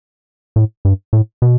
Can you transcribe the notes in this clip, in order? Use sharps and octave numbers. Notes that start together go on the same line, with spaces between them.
A2
G2
A2
B2